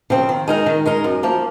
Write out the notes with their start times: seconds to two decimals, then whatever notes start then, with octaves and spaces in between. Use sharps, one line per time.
0.10 C#3 F3 C4
0.29 D#3
0.48 G#3 D#4 A#4
0.66 D#3
0.86 G#3 D#4 A#4
1.04 F#2
1.23 F3 A#3